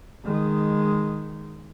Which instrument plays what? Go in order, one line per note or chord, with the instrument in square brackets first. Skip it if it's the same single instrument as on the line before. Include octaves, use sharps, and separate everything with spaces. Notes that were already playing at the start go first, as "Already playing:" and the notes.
[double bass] D#3 G#3